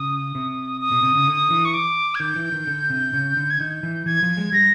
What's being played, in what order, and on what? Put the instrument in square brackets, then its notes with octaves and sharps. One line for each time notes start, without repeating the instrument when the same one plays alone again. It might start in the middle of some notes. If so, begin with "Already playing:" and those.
Already playing: [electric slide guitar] C#3 [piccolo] D#6
[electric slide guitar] C3
[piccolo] D#6
[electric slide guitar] B2
C3
C#3
D3
E3
[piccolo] C#6
D6
G#6
[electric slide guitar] D#3 [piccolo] G6
[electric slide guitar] E3
D#3
D3
C3
C#3
D3
[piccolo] G#6
[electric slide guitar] D#3 [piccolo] G6
[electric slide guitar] E3
[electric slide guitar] E3 [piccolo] G#6
[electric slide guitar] F3
G#3
[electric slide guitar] G3 [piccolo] A#6